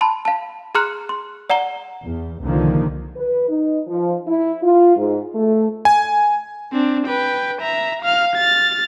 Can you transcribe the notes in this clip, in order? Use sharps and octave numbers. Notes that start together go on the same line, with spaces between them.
A5 B5 C6
F5 A5
G#4 A#5 C6 F6 F#6 C#7
C6
D5 F#5 A#5 G7
E2
C2 D3 D#3 F3 A#3
B4
D#4
F3
E4
F4
G#2
A3
G#5
C4 D4
B4 G5
E5 A#5
F5 F6
F6 A6